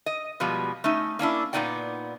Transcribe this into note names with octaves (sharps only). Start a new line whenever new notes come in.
D#5
B2 F3 G3 G#3 B3
A3 C#4 D#4
A#3 C#4 D4 E4
A#2 B3 C#4 D#4 D5 G5